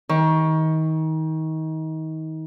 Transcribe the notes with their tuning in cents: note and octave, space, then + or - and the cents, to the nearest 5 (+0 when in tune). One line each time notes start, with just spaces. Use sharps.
D#3 +30